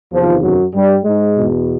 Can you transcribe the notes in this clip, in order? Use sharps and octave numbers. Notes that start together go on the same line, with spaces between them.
E2 C3 D#3 F3
F#2 F#3
G2 G3
G#2 G#3
E2 B2